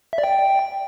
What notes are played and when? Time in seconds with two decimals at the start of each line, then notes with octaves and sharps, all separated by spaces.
0.13 E5
0.18 D5
0.23 G5